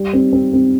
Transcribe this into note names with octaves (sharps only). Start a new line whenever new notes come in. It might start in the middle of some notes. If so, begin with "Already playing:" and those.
Already playing: G3
C4
C4
C4